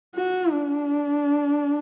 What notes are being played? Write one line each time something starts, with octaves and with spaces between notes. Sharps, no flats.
F#4
D4